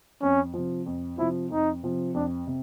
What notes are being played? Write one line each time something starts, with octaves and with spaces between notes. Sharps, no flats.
F2 C#4
C3 F3
F2
C3 F3 E4
F2 D#4
C3 F3
F2 D4
C3